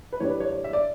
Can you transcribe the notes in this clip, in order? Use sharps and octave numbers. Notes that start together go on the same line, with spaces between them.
B4
A2 E3 G3 D4 C#5
B4
C#5
C#5
E5
D5